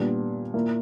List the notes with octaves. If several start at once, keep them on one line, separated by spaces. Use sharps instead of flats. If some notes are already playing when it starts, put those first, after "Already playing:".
Already playing: A#2 G3 B3 D4
A#2 A#3 E4